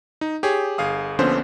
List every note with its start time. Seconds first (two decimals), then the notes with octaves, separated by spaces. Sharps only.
0.21 D#4
0.43 G4 G#4 C#5
0.78 G1 G#4 F5 D#6
1.19 A#1 A#2 D3 B3 C#4 C5